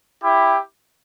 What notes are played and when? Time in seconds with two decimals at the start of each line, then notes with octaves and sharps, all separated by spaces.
0.23 E4 G4